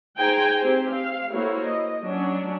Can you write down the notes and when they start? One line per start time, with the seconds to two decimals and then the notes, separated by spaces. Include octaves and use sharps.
0.18 D#4 G#4 C5 G5 G#5 A#5
0.61 C4 G4 C5
0.93 F5
1.32 A#3 E4 F#4 A4 C5 C#5
1.66 D#5
2.05 F#3 C#4 D4